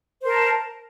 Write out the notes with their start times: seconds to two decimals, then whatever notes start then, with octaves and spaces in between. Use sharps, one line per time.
0.21 C5
0.25 A#4
0.28 A5